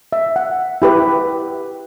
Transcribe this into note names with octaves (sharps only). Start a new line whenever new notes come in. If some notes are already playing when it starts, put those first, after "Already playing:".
E5
F#5
E4 G4 B4